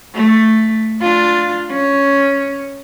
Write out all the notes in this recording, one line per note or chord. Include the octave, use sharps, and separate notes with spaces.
A3
D4 F4
C#4